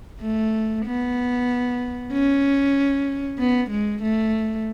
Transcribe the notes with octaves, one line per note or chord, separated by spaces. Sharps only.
A3
B3
C#4
B3
G#3
A3